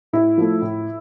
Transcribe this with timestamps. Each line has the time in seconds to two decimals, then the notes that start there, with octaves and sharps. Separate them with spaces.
0.13 A2 E4
0.38 F3 A3
0.62 A2